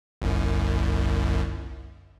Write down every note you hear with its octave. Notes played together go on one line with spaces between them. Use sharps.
G1 C2 F#2